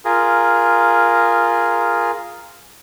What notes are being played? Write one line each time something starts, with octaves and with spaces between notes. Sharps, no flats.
F4 G#4 A#4